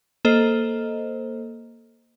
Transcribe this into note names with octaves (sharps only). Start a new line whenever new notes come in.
A#3 A4 C5 D#5